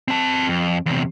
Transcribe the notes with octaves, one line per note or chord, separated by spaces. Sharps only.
C4 A5
F2
E2 C3